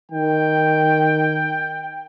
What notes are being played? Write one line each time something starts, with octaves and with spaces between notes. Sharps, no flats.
D#3 G5